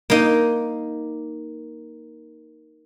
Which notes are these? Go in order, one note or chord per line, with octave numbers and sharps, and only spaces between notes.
A#3 D#4